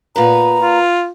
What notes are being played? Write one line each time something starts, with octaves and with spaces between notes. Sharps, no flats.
A#2 B3 B4 A#5
F4